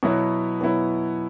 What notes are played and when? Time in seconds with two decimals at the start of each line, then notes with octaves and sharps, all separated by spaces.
0.03 B2 F#3 B3 E4
0.61 B2 F#3 B3 E4